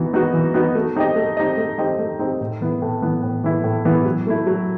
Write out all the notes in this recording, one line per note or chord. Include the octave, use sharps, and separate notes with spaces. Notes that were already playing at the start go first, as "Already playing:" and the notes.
Already playing: E3 B3 D#4 F#4
B3 D#4 F#4
E3
B3 D#4 F#4
A3
C4 D#4 G4 D#5
A3
C4 D#4 G4 D#5
A3
C4 D#4 G4 D#5
A3
C4 D#4 G4 D#5
A2
E3 B3 E4
A2
E3 B3 E4
A2
E3 B3 E4
A2
E3 B3 E4
F#3
A3 E4
F#3